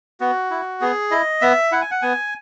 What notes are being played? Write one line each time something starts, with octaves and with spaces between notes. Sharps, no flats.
B3 F#4
E4
B3 G#4
E4 D#5
B3 E5
E4 F#5
G#5
F#5
B3 G#5